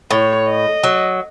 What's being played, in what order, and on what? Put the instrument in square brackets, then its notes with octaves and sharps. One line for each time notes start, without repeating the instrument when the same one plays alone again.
[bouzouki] A2 [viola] C#5
[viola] D#5
[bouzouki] F#3